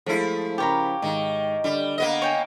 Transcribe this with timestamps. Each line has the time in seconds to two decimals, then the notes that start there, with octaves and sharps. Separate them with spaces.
0.06 F3 G#3 A3 E4
0.58 C#3 G4 A#4 C#5 A#5 B5
1.02 G#2 D#3
1.64 D3 G3
1.98 A#3 B3 D#5
2.22 C#5 G5 G#5